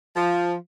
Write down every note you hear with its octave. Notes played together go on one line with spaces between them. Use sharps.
F3